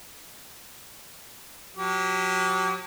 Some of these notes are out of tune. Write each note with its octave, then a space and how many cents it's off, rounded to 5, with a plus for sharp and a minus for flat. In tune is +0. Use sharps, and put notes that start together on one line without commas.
F#3 -40 G4 -40